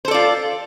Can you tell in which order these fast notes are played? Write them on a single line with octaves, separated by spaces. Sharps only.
C5 A4 D5 F4